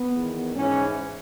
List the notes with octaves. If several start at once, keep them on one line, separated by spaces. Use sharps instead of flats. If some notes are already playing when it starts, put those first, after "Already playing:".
Already playing: B3
E2 D#3
G#2 E3 C#4